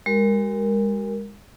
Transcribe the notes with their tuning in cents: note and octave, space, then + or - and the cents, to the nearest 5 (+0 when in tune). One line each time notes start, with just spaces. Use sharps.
G#3 -30 F#4 +45 A#4 +0